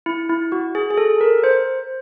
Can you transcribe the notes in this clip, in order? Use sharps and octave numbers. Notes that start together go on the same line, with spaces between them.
E4
E4
F#4
G#4
G#4
A4
A#4
C5